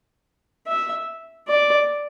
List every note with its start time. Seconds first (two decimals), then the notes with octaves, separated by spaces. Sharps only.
0.67 E5
1.48 D5